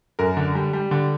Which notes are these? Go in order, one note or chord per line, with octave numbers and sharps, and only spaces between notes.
F#2 A#4
D3
G3
G3
D3